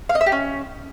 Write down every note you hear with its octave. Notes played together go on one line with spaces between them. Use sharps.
F5
D#5
E5
G4
C#4